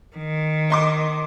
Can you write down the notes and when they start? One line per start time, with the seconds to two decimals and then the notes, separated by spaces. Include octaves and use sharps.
0.17 D#3
0.70 D#5 C6 D6